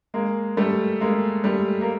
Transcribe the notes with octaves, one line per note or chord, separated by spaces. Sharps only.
G#3 A#3
G3 A3
G#3 A#3
G3 A3
A#3